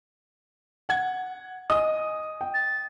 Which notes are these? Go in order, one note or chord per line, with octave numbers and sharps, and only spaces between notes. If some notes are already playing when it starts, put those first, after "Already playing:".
F#5 G#6
D#5 G#5 D#6
G5
A6